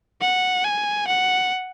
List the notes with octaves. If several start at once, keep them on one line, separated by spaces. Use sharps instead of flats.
F#5
G#5
F#5